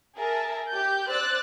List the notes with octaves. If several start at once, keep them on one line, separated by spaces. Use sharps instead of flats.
G#4 A#4 E5 A5
G4 G6
C5 D5 E6 F#6 A6